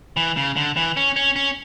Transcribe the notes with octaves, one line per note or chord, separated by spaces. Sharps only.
E3
C#3
D3
E3
C#4
C#4
C#4